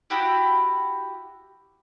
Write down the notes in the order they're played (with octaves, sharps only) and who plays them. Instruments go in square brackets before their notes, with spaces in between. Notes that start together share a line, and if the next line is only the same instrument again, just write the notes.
[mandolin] E4 F#4 G4